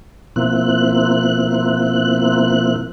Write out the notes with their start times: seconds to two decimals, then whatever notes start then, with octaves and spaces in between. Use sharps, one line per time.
0.36 B2 F3 A#3 C4 E4 F#6